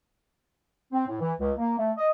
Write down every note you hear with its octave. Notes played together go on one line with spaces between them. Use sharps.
C4
A2
E3
C#2
A#3
A3
D#5